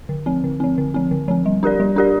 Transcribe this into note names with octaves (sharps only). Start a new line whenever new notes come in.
D3
F3 C4
D3
F3 C4
D3
F3 C4
D3
F3 C4
G3
D4 G4 A#4 D5
G3
D4 G4 A#4 D5